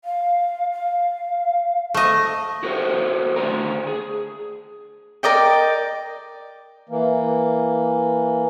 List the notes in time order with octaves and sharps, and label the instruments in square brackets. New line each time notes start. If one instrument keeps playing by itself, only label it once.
[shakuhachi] F5
F5
[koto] A3 D#5
[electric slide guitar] F#4 G4 A4 C5 C#5
D3 A3 C5 D5 A#5
G#4
[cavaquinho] A#4 D5 D#5 G5
[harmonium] E3 A#3